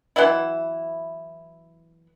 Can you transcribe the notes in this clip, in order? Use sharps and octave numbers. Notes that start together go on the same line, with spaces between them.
E3 F#3 B3 E4